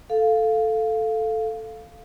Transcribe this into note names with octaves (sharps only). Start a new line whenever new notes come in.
A4 F5